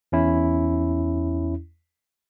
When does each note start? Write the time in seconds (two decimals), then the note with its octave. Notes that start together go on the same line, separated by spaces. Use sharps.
0.12 E2 C#4 E4